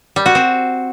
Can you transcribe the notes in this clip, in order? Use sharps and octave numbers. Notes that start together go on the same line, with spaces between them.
G3
F#4
C4